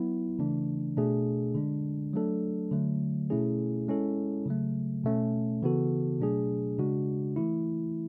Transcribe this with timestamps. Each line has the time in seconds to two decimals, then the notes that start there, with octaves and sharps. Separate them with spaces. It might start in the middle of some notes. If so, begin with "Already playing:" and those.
Already playing: F#3 B3 E4
0.39 C#3 E3 A3 D4
0.97 B2 A3 D4 G#4
1.55 D3 G#3 D4
2.13 F#3 A3 D4 A4
2.71 D3 F#3 A3
3.30 B2 A3 C#4 E4 G#4
3.88 G#3 C#4 E4 A4
4.46 C#3 F#3 A3
5.04 B2 A3 C#4
5.63 C#3 E3 B3 F#4 A4
6.21 B2 F#3 A3 D4 G#4
6.78 C#3 G#3 D4 F#4
7.36 E3 A3 E4